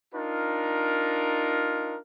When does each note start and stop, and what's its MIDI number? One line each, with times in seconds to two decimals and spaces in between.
0.14 1.97 62
0.14 1.97 63
0.14 1.97 65
0.14 1.97 70